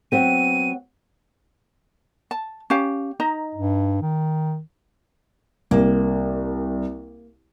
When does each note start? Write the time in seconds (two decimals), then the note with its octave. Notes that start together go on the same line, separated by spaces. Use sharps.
0.12 F#3 B3 C4 D#7
2.31 A5
2.70 C#4 G4 F5
3.20 D#4 D#5 A#5
3.55 G2
4.02 D#3
5.71 C2 A#3